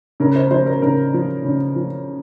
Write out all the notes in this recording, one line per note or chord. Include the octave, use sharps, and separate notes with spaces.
C#3 A#4
C5
F3 C5
A#4
C#3 A#4
F3
C#3
F3